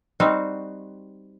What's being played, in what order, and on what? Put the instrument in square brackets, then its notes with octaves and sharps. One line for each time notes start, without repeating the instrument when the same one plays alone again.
[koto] G3 C4 D#4 F#4